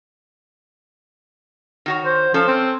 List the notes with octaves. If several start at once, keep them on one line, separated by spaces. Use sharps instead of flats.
D#3 F#4 C#5
C5
F3 C#4 A4 C5
C4